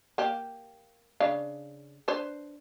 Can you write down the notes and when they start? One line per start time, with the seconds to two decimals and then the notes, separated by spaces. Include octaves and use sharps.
0.18 A#3 G4
1.20 C#3 D4 F5
2.08 D4 B4 C5